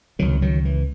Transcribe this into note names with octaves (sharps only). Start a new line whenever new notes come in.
C#2 C3 D#3 F#3
D#3 F#3
E3